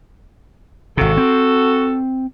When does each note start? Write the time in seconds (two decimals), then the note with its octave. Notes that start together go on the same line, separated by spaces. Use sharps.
0.97 G#1 C3 F#4 A4
1.17 C4